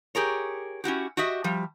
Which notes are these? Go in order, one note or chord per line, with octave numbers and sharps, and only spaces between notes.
G4 G#4 A#4 C#5
C#4 E4 F#4 G4
F#4 G4 D#5 E5
F3 G3